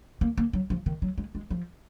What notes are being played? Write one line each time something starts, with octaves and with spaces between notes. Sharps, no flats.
A#3
A#3
F#3
F3
D#3
F#3
G#3
G#3
F3